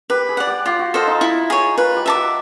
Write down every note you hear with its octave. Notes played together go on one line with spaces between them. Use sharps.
G4 B4
G#4
D5 F#5
G4
F4 G4
F#4
F4 A4 C5 D#5
D#4
E4
G#4 C#5
F4 B4
G4
E5 A5 D6
F#4